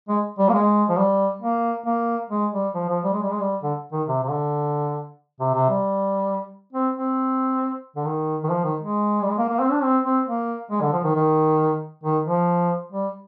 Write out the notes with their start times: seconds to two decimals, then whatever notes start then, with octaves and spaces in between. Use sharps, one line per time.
0.09 G#3
0.39 G3
0.49 A#3
0.53 G#3
0.89 F3
0.98 G3
1.42 A#3
1.86 A#3
2.30 G#3
2.53 G3
2.75 F3
2.89 F3
3.04 G3
3.13 G#3
3.22 G3
3.31 G#3
3.40 G3
3.63 D3
3.92 D#3
4.08 C3
4.23 C3
4.30 D3
5.40 C3
5.55 C3
5.70 G3
6.73 C4
6.95 C4
7.96 D3
8.05 D#3
8.44 D#3
8.50 F3
8.64 D#3
8.79 G#3
9.22 G3
9.30 G#3
9.38 A#3
9.49 A#3
9.60 C4
9.71 D4
9.82 C4
10.04 C4
10.26 A#3
10.71 G#3
10.82 D3
10.93 F3
11.04 D#3
11.15 D#3
12.04 D#3
12.26 F3
12.92 G3